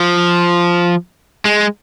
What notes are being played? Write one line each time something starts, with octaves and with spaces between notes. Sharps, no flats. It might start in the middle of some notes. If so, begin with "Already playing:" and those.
Already playing: F3
G#3